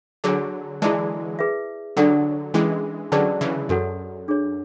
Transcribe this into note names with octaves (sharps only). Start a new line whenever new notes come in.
D3 F#3 G#4 C#5 G#5
E3 G#3 E4 G#4 D5 A5
G#4 B4 E5
D3 F#3 D4 A4 D5 F#5
E3 G#3 C#4 E4 G#4
D3 F#3 C#4 G#4 B4 D5 A5
C#3 E3
F#2 F#4 A4 C#5 F#5
D4 G#4 C#5